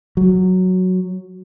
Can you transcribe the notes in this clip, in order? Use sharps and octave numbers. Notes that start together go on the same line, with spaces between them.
F#3